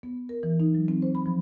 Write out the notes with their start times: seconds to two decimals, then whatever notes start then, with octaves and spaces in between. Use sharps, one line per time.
0.03 B3
0.29 A#4
0.43 E3
0.60 D#4
0.75 F#3
0.88 C4
1.02 C5
1.15 B5
1.26 F3